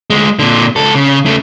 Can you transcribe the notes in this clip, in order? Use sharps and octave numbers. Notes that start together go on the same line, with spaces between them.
D2 G#3
A#2 D3
C#2 A4
C#3
C#3 A3